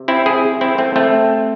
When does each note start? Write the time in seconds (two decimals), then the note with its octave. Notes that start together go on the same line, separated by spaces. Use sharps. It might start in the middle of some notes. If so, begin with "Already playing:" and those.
Already playing: C3
0.08 C4 E4
0.26 E4 G#4
0.61 C4 E4
0.78 A3 C4
0.96 A3 C4